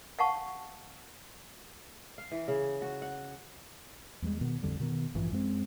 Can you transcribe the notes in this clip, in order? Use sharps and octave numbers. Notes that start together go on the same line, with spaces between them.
F5 F#5 A5 C#6
F5
E3
C#3
F#4
F#5
E2 G3 G#3
B2 D#3 B3
A1 F2 D3 G3
B2 D#3 B3
A1 G2 E3 F3
F#2 G#3 A3 C4